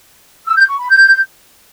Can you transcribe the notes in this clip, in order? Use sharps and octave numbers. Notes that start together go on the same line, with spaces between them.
E6
G6
C#6
B5
G6